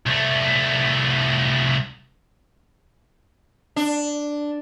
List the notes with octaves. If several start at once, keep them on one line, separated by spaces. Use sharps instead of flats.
C2 A3
D4